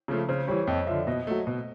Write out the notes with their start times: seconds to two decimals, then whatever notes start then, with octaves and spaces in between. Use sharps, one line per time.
0.08 C#3 F3 A3
0.29 C#3 C5
0.48 E3 G3 C#5
0.67 F2 D#5
0.87 D3 F3 E5
1.07 B2 D#5
1.27 F#3 A3
1.47 B2